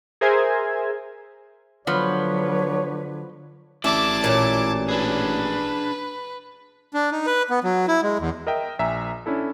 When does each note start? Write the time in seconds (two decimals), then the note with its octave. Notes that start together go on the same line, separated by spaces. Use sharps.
0.21 G#4 A#4 C5 E5 G#5 G#6
1.87 D3 F3 F#3 B3 B4 C#5
3.84 A1 E4 D5 E5 A5 D6
4.24 A#2 D3 F#3
4.89 D4 G#4 B4
6.94 D4
7.11 D#4
7.27 B4
7.50 B3
7.64 F#3
7.88 E4
8.02 G#3
8.19 E2
8.47 A#4 D#5 E5 G5
8.79 A#1 E5 G#5 A#5
9.26 C#4 D4 E4 A4